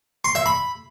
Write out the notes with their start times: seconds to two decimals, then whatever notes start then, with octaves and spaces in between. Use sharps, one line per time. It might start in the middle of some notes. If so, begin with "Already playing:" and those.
0.25 C6
0.35 E5
0.46 B5